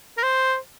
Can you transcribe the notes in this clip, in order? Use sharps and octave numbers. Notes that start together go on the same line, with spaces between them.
A#4
C5